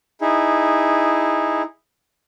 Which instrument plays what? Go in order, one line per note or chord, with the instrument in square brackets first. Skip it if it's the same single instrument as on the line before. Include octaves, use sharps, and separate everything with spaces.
[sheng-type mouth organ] D#4 E4 G#4